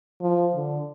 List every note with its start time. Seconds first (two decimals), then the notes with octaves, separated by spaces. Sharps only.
0.21 F3
0.55 D3